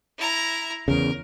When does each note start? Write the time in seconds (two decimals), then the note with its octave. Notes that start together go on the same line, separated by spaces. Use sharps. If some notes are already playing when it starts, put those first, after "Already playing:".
0.18 E4 A#5
0.88 E2 C#3 A#4